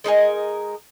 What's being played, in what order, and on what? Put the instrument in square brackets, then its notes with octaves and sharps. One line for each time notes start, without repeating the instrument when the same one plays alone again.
[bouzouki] G#3 D#4 A#4 G#5